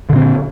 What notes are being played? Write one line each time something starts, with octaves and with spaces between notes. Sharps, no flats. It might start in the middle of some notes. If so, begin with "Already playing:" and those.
A#2 D3 C4